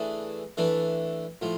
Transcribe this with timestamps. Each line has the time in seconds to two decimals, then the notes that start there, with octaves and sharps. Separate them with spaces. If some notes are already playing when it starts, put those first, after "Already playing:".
Already playing: E3 A3 D4 G#4
0.57 E3 A3 D4
1.41 A2 F3